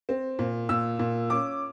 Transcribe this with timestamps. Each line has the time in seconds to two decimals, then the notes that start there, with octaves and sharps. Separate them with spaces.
0.09 C4
0.39 A#2
0.69 A#2 E6
0.99 A#2
1.30 C#4 D6